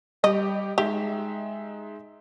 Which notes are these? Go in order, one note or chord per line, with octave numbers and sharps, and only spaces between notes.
G3 G4 D#5
G#3 D#4 G4 E5